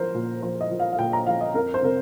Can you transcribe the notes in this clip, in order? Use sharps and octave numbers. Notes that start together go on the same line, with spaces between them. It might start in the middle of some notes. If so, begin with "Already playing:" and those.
Already playing: F3 A#4 C5
A#2
F3 C5
D#5
F3
F5
F5
A#2 G5
A#5
F3 F5
D#5
F2 A#4
C5
C3 A#4